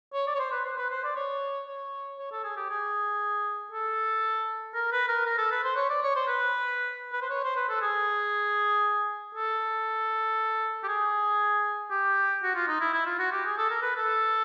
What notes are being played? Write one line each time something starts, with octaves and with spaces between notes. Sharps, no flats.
C#5
D5
C#5
C5
B4
C5
B4
C5
D5
C#5
C#5
C#5
A4
G#4
G4
G#4
A4
A#4
B4
A#4
A#4
A4
B4
C5
C#5
D5
C#5
C5
B4
B4
C5
C#5
C5
B4
A4
G#4
A4
G4
G#4
G4
F#4
F4
D#4
E4
E4
F4
F#4
G4
G#4
A4
A#4
B4
A4